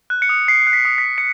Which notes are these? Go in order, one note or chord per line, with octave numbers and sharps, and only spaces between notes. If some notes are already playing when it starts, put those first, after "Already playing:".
F#6
C#7
D#6
D#6 C7
F#6
B6
D#6
B6
D#6
C#7